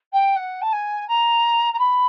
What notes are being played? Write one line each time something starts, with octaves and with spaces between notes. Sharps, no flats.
G5
F#5
A5
G#5
A#5
A#5
B5